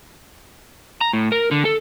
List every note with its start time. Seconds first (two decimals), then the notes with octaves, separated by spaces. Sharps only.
1.01 A#5
1.13 A2
1.32 A#4
1.51 D3
1.65 A4